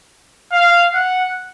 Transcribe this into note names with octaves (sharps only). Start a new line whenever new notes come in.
F5
F#5